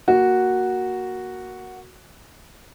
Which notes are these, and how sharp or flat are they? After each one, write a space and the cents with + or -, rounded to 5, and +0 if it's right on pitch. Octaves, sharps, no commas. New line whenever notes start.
A#3 +0 F#4 +0